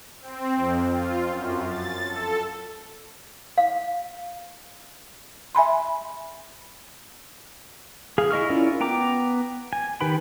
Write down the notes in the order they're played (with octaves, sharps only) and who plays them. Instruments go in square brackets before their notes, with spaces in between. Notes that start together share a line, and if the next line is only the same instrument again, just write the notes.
[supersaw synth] C4
F2
F4
F#2
A6
A4
[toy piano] F5
[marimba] E5 G#5 B5 C6
[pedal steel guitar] G#4 F5
E4 D#5 C#6 F6
C#4 E4 F4 A#4 D5
B3 G5 A#5 D6
G#5
D#3 G4 B4 G5 B5